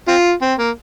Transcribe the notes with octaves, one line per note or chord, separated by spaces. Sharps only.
C4 F4
C4
A#3